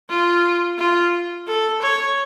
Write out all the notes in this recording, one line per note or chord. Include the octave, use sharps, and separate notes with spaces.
F4
F4
A4
C#5